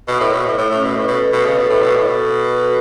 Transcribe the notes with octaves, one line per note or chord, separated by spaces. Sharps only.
B2
A2
B2
A2
A2 A3
A2 C#4
B2
A2
B4
B2 A4
A4
B2 B4
C#3 A4
B2 B4
A2 A4
B4
B2 A4
A2 B4
B2 A4
F#4